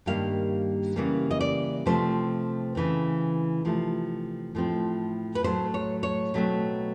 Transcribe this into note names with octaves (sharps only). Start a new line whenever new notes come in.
G2 D#3 G3 A#3 F5
C#3 E3 G3 A#3
D#5
D5
C3 F3 A3 C4 C5
C#3 E3 A3 C4
C3 F3 A3
A2 F3 A3 C4
B4
A2 F#3 A3 C5
C#5
C#5
B2 F#3 A3 C4